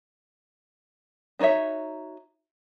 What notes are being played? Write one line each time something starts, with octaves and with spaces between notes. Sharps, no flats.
D4 D#4 F#4 C#5 E5